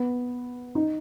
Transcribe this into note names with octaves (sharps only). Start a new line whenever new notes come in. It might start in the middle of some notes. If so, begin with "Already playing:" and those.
Already playing: B3
D#4